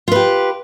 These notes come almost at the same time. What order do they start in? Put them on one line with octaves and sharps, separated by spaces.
F4 B4 G4